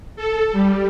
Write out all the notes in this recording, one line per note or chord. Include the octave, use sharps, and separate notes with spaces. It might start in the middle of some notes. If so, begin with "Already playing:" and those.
A4
G3